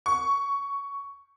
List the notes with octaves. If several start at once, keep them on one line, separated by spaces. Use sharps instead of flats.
C#6